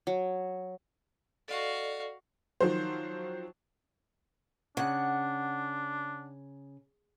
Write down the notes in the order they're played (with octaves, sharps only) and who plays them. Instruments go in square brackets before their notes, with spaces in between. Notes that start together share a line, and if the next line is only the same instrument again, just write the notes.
[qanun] F#3
[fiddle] F#4 F5 [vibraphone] A4 D5 D#5
[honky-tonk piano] D#3 F3 F#3 C5
[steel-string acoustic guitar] C#3 [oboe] D4 [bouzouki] F#5